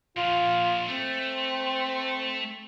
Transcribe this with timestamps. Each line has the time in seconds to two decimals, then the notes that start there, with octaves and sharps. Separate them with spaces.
0.17 A#2 F3 F4
0.88 A3 C4